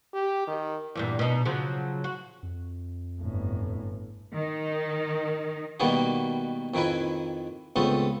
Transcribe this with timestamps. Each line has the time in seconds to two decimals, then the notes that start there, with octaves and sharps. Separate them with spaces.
0.14 G4
0.47 D#3
0.95 E2 G2 A#2
1.19 B2 D#4
1.45 C#3 F3 F#3
2.04 F#4
2.43 F2
3.20 G1 A2
4.33 D#3 D#4
5.80 B2 D#3 G3 A#3 B3 F#4
6.74 F2 D#3 E4 A#4 B4 G#5
7.76 C#2 A3 B3 C4 A4 D#6